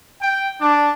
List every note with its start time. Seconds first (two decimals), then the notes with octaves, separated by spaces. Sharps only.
0.21 G5
0.60 D4